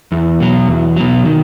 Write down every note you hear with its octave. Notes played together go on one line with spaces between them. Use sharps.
E2
B2 F#3
E2
B2 F#3
D#3